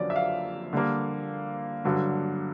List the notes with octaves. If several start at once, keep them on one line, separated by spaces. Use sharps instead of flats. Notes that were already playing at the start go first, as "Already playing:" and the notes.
Already playing: F2 D3 F#3 A#3 C#4 D5
E5
F5
D3 G3 A#3
G2 D3 F#3